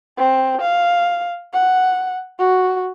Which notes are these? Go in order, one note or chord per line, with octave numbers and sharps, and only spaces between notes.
C4
F5
F#5
F#4